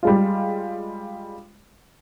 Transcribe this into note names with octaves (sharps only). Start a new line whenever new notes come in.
G3 G#3 F4